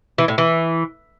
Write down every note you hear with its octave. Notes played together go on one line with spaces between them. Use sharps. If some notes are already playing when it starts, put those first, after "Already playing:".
E3
A2
E3